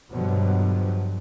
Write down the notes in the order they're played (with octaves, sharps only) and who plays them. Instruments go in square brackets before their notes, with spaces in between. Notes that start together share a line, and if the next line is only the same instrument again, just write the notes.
[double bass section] G2 B2 D3 F3 F#3